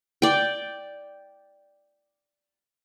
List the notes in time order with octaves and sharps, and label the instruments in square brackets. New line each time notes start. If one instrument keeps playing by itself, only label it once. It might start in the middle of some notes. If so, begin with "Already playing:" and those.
[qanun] D5 G5